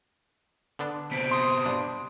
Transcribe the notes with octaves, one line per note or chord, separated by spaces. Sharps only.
D3 B3 D4
B2 C4 B6
C6 D#6
G2 D4